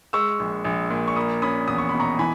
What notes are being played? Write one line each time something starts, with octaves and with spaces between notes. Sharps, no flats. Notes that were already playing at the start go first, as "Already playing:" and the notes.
G#3 C#6 E6
A#1
A#1
A#2
C#6
A#3 B5 D#6
C#4 B5 D#6
E2 D#6
C#6
B2 B5
A#5 C#6
E3 G#5 B5